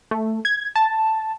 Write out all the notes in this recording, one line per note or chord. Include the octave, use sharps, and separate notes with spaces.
A3
G#6
A5